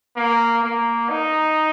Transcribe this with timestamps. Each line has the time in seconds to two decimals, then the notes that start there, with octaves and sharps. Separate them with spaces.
0.16 A#3
0.63 A#3
1.09 D#4